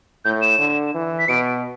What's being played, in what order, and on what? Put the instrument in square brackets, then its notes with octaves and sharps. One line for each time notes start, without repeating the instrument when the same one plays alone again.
[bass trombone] A2 [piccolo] G6
[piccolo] E7
[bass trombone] D3
E3
[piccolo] B6
[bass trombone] B2 [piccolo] D7